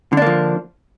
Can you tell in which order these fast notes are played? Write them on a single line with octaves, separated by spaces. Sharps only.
D3 D4 A#3 F3